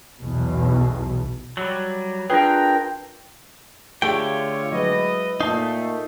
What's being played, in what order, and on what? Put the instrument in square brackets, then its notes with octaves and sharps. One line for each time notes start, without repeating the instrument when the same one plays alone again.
[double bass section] B1 E2 B2
[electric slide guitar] F#3 G3
[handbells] D4 F4 B4 [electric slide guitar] G#4 A#4 [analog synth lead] G5
[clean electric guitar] D3 A3 G5 [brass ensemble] F4 C#5 [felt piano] G4 G#4
[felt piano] F#3 G#3 [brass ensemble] E4 B4 D#5
[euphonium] A#2 [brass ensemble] A3 [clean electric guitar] D#4 [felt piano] D#5 A5 C7